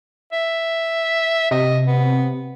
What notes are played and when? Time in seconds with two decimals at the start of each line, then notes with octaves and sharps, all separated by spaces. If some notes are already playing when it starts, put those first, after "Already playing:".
0.33 E5
1.51 C3 D#5
1.86 B3